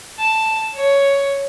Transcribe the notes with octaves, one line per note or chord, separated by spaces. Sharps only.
A5
C#5